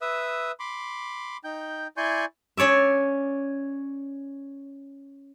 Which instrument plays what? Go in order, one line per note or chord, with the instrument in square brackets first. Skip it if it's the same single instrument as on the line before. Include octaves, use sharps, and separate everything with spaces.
[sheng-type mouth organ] B4 E5 D#6 E6
B5 C6 D6
D#4 G5 G6
E4 D5 G#5 C6 C#6 G6
[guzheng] C#4 C#5 D5 E5